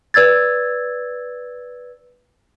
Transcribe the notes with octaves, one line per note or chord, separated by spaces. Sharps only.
B4 D5 E6 G#6 A6